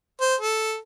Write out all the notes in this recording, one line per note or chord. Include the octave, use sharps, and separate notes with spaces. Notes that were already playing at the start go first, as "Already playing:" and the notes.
C5
A4